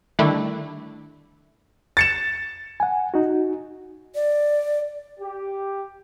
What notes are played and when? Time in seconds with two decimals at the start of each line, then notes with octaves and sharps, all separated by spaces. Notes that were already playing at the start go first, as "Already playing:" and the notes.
0.19 D3 D#3 G3 A3 D4 E4
1.97 A6 C#7 E7
2.80 F#5 G#5
3.14 D#4 F#4
4.15 D5
5.20 G4